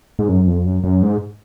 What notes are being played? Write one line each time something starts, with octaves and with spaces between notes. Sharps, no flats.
G#2
F#2
F2
F#2
F#2
G#2